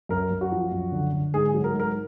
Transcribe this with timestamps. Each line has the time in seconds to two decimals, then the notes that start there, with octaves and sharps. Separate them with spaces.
0.09 F#2 A#4
0.31 F#2
0.41 F#4
0.52 F3
0.72 F#2
0.92 D3
1.13 D3
1.34 G#2 G#4
1.49 F#3 G#4
1.64 A#4
1.74 G#2
1.79 A#4